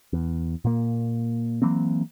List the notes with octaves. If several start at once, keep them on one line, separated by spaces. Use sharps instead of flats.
E2
A#2 A#3
E3 F#3 A#3 C4